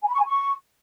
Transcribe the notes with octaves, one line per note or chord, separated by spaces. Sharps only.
G#5
B5
C#6
G#5
C#6